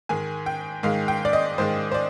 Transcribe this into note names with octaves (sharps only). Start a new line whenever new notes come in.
G#2 D#3 G#3 G#5
G5
G#2 D#3 G#3 F5
G5
D5
D#5
G#2 D#3 G#3 C5
C5
D5